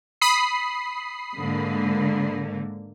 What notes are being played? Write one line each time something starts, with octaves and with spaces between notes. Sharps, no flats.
B5 D#6 C7
G#2 D3 A#3